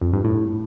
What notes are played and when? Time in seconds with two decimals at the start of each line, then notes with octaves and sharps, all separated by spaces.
0.01 F2
0.13 G2
0.24 A2